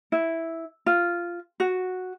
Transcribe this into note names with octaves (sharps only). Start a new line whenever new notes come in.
E4
F4
F#4